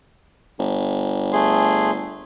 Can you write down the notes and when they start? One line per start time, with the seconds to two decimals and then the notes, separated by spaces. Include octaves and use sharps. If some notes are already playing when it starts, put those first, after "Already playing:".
0.59 G1
1.33 A3 G#4 C6